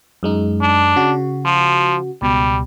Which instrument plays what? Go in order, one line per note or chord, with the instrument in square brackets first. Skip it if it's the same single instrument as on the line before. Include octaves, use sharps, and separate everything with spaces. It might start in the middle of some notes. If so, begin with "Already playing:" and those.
[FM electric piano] F#2 G#3 D#4
[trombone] D4
[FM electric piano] C#3 F#4
[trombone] F3
[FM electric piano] C#2 B2 [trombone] G3